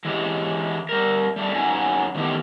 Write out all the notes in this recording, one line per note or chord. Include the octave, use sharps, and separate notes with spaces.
E3 G#3 E4 G4
G3 A#4
G3 A3 D4
F#2 C#3 F#3 D#4 G#5 A#5
D#3 E3 A3 B3 G4